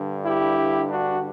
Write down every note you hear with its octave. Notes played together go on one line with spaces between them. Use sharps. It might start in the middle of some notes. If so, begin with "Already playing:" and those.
Already playing: G2 D3
E4 G4
D4 F#4